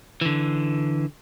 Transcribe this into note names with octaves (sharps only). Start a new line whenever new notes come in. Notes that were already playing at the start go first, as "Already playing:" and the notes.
D3 E3